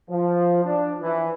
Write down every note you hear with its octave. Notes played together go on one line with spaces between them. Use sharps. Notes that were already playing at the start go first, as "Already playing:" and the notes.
F3
D4
E3